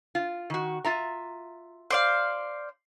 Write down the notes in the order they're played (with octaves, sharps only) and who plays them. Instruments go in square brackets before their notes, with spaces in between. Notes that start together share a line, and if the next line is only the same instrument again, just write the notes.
[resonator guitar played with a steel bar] F4
D#3 F#4
F4 E5 A#5
[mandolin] C5 D5 F5